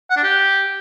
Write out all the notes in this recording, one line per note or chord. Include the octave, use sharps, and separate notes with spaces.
F#5
D4
G4